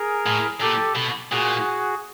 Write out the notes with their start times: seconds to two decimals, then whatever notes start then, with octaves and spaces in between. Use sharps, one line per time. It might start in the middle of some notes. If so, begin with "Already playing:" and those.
Already playing: G#4 A#4
0.26 A2
0.61 A#2 G4 A4
0.96 B2
1.31 A#2 F#4 G#4